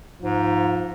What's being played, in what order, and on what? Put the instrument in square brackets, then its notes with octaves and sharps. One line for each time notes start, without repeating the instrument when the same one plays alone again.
[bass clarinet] G#2 [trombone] F3